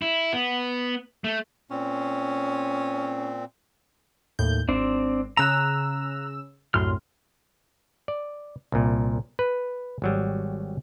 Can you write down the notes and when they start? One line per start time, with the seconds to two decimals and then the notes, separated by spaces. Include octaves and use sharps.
0.02 E4
0.33 B3
1.24 A3
1.71 A#2 C4 C#4
4.39 D#2 A2 G6
4.69 G#1 C4 D4
5.37 C#3 A#5 E6 F#6
6.74 C2 F#2 A2 C6 F6
8.08 D5
8.72 C2 A#2
9.39 B4
10.02 G#1 F#3 G3